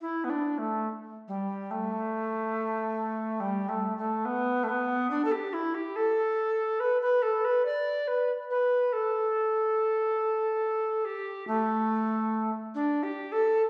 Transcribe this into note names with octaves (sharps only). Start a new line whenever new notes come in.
E4
B3
D4
A3
G3
A3
G3
A3
A3
B3
A3
B3
D4
A4
G4
E4
G4
A4
B4
B4
A4
B4
D5
B4
B4
A4
G4
A3
D4
G4
A4